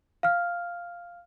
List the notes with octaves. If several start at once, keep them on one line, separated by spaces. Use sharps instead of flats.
F5 F6